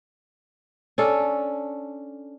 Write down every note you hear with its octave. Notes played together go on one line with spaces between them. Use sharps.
C#4 D4 A4